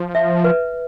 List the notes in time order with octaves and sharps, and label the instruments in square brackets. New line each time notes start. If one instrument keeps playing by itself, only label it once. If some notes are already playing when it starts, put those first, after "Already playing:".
Already playing: [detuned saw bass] F3
[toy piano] E5
B4